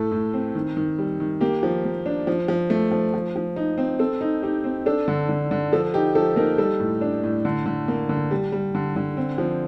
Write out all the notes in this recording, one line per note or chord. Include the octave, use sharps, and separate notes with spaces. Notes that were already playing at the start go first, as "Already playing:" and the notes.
Already playing: A2 A3 A4
A2
C4
D#3
D#3
G3
D#3
A#3 G4
F3
A#3
D4
F3
F3
A3
F3
F3
F3
D#4
C4
C4 A4
D#4
D#4 G4
C4
D4 A4
D3
D3
D3
F3 A4
D#4 G4
F3 A4
A#3 D#4 A#4
G3 A4
A2
D4
A2
D3
D3
A#3
D3
G3
G3
D3
D3
C4
F3